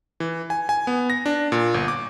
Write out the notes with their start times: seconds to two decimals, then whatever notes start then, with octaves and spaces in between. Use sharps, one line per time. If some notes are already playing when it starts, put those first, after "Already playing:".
0.20 E3
0.50 G#5
0.69 G#5
0.87 B3
1.10 A#6
1.26 D4
1.52 A#2
1.74 G1
1.88 D6